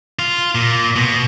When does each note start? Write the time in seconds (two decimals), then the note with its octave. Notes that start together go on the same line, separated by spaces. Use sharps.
0.19 F4
0.55 A#2
0.96 B2